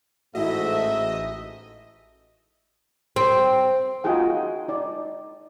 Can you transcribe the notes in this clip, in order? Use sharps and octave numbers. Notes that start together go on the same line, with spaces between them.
A1 G#2 A3 E4 F#4 D#5 E5
C4
D#4 F4 F#4 G#4 G5
D#4 D5